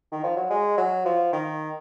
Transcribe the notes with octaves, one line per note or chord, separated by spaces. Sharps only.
D#3
F3
F#3
G#3
F#3
F3
D#3